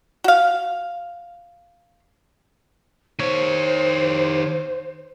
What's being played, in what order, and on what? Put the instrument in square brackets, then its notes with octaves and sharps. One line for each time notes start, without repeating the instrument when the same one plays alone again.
[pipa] F#4 F5
[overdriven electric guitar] D#3 C#5 [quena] C5